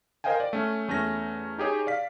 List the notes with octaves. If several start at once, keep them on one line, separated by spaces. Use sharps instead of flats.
A#4 C5 D#5 F5 G5 G#5
D5
A3 C#4
E2 A3 C#4 A#6
D#4 G4 G#4 C#5
D5 F5 B6